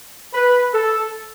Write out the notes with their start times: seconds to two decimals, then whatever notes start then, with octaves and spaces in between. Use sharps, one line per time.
0.34 B4
0.74 A4